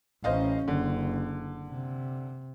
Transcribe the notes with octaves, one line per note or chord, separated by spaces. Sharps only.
A1 C#4 C5 D#5 F5
F#1 D3
C3